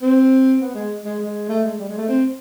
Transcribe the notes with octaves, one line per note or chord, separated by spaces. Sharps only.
C4
B3
G#3
G#3
G#3
A3
G#3
G3
G#3
A3
C4